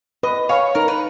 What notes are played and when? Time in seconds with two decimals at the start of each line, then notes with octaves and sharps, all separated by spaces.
0.23 B4 D#5
0.49 C#5 F5 G#5 B5
0.75 D#4 A#4
0.88 B4